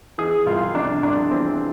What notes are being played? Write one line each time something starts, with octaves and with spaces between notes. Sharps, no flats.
E3 G#4
C2 F4
C3 D4
C2 D4
E3 C4